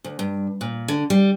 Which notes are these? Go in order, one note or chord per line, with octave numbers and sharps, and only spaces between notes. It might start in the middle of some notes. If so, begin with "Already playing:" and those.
D2
G2
A#2
D3
G3